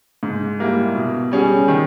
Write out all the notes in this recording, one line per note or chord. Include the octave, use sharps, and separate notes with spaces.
G#2
G3 A#3 E4
B2
G3 C#4 G#4
D#3